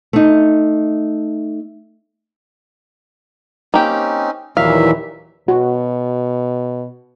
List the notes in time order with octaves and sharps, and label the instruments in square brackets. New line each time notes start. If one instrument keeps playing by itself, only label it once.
[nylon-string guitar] A3 D#4
[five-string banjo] A#3 G4 [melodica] C4 C#4 D#4
[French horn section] D#2 A#2 E3 [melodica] F#3 E5 [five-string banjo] F5
[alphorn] B2 [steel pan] F#4